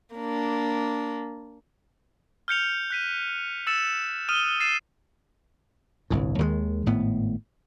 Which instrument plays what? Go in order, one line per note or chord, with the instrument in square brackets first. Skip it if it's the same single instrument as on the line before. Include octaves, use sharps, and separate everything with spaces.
[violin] A#3 D4
[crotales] F6 G6 C#7 F7
F#6 B6 D#7
E6 A6 C#7 E7
D#6 F6 D#7 E7 G7
A6 C7 D#7 E7
[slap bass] G1 C2 A2
D#2 D#3 E3 G#3
G#1 A2 B3